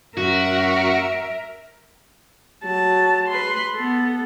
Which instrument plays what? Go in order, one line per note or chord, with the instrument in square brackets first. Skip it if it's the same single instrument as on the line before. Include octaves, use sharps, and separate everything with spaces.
[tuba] F#2 [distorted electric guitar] F#4 [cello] A#4 E5
[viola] F#3 A5
B4 C6
B3 A4